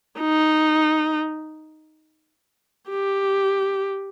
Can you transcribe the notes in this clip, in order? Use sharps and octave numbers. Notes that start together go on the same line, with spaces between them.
D#4
G4